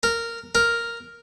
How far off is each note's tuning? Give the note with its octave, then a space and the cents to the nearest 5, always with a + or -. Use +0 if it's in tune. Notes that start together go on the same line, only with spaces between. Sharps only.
A#4 -10
A#4 +0